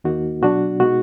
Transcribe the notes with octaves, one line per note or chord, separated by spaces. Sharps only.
D#2 D#3 A#3 D#4 F#4
B2 F#3 D4 F#4
B2 G#3 D#4 F#4